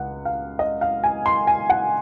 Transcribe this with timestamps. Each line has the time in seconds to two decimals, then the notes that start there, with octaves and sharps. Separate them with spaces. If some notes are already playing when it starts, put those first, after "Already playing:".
Already playing: C#2 F#5
0.25 F5
0.59 D#5
0.81 F5
1.04 G#5
1.26 C6
1.47 G#5
1.70 F#5